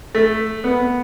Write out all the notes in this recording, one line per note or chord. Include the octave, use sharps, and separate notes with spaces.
A3
B3